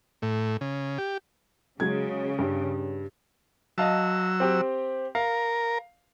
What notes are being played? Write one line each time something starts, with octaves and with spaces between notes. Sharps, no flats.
A2
C#3
G4
C#3 F#3 G#3 G#6
G2
F#3 D#5 F5 A5 E6
C4 G4
A#4 F5